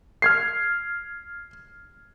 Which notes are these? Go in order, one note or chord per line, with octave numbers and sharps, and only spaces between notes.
F6 G#6 C7